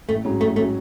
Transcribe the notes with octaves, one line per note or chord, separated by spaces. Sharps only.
A1 A3
G#2 F#3 C#4
A1 A3
F#3 A3 C#4